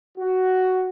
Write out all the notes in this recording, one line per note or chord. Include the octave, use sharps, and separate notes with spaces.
F#4